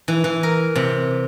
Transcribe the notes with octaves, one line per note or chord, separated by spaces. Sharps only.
E3
E3
A#4
C3